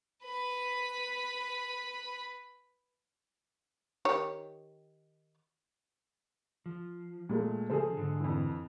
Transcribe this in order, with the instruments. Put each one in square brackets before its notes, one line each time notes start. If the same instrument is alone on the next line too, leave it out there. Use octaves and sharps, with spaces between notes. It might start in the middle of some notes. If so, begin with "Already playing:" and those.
[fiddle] B4 B5
[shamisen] D#3 G4 C#5
[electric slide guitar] F3
[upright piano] A#2 G#3 A3
[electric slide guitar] C#3 F3 [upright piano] G#4 A4 C5
[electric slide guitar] G#2 D3
[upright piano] F2 E3